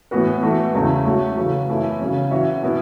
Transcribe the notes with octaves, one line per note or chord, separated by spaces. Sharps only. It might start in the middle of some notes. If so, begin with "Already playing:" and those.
A2 E3 B3 F#4 B4
E3 A3 F#4
E2 C#3 A3 C#4 E4
F#3 A3 F#4
C#3 E3 C#4 F#4
F#2 E3 A3 E4
C#3 F#3 C#4
E3 C#4 F#4 C#5 E5
B2 B3 E4